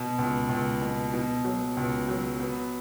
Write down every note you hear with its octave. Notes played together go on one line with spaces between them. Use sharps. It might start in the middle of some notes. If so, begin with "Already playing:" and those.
Already playing: B2
C#2
C#2
B2
B2
F#3
C#2
F#3
B3